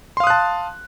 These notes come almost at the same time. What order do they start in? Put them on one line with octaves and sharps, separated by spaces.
C6 F5 D#6 F#6 A5